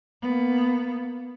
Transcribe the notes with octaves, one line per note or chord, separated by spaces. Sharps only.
A#3 B3